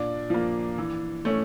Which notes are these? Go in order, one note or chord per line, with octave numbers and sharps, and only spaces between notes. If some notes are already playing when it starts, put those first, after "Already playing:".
Already playing: A#2 D4 D5
F3 A#3
E3
A3 C#4